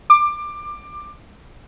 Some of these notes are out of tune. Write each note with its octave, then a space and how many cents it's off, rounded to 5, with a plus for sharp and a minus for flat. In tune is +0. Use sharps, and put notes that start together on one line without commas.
D6 +20